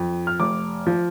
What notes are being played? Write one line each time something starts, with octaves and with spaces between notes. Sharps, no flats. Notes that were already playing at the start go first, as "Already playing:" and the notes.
Already playing: F2
F6
F1 D6
F3